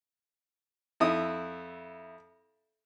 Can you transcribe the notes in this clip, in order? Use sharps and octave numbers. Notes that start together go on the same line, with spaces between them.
F2 E4 D#6